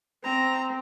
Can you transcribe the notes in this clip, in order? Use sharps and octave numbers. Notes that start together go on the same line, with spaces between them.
C4 A#5